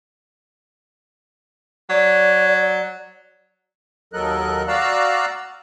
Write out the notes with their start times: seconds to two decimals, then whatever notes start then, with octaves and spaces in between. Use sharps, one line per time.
1.90 F#3 D5
4.13 D#2 F#3 A4 A#4 D#5 F#6
4.68 F#4 D5 F5 A#5 E6 F#6